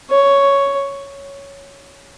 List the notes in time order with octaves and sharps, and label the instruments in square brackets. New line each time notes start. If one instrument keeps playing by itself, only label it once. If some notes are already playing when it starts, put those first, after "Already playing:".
[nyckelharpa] C#5